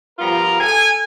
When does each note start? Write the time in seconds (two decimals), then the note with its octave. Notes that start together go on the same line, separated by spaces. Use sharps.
0.19 F3 G3 B3 F4 A#4 A#5
0.61 A4 G#5